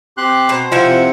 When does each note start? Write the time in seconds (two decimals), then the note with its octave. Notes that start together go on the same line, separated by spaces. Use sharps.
0.17 C4 G4 C6 F#6
0.49 B2 C5 A#5
0.72 C3 F3 C4 E4 E5 F#5